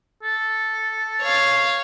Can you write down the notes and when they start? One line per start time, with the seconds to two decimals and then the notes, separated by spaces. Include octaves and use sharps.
0.23 A4
1.22 C#5 F5